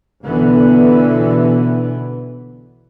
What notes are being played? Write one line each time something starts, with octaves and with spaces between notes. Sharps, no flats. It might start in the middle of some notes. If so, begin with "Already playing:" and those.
B1 B2 D3 E3 B3